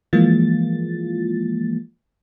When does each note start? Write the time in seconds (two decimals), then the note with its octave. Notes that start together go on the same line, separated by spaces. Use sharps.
0.13 E3 F3 G#3 A#3 F4 A6